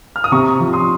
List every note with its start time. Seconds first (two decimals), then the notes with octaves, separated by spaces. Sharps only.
0.16 F6
0.24 D#6
0.32 C3 A#5 C#6
0.60 F3
0.73 C6 D#6